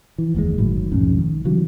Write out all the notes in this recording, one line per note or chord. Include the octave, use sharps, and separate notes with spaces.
E3
F1 D#2 A2 G#3
G1 A2 D#3 F#3
B1 F2 G#2 C#4
D#3
C#3 E3 F#3 G3